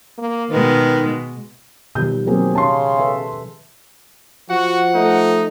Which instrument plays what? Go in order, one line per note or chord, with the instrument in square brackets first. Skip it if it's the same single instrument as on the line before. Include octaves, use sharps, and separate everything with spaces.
[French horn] A#3
[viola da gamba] B2 G#3 [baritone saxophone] D#3 [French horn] B4
[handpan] B2 D#3 F3 [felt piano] G3 G6
[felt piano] F#3 A#3 C4 [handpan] G3 G4 G#4
[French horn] C#3 [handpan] C#4 [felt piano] A5 C6
[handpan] A4 B4 E5
[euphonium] F3 [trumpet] F#4 [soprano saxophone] F#5
[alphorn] A3 [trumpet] D#4